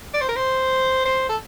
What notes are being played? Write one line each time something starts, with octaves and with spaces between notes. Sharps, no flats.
D5
C5
A#4
C5
C5
A4